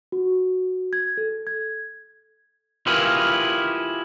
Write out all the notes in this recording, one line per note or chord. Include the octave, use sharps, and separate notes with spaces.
F#4
G#6
A4
G#6
E4 F4 G4 G#4 A#4 B4